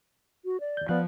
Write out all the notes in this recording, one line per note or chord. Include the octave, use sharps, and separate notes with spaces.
F#4
D5
D#2 G6
F3 B3 D5 F5 F#6